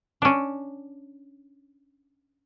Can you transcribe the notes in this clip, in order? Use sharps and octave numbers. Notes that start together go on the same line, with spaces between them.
C#4 D4